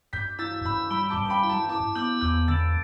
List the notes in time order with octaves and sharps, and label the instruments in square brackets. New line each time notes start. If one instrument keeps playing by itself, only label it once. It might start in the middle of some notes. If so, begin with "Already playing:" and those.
[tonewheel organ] G2 [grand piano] G6 B6
[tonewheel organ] E4 [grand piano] E6 A6
[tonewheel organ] G2 [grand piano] B5 E6
[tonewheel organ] G3 [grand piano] B5 E6
[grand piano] A5 D6
[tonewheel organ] G2
[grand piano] D6
G5 B5
[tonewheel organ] E4
[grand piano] A5
[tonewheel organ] E4 [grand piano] A5 D6
[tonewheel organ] B3 [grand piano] D6 G6
[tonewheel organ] E2 [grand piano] D6 G6
[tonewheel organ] D3 [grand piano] E6 A6